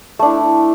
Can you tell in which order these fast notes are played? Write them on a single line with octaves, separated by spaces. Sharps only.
A3 D4 E4